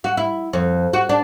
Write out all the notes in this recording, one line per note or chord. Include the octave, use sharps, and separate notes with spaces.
F#4
E4
F2
F#4
D4